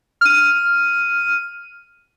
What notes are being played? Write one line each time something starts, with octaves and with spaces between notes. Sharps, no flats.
F6 D#7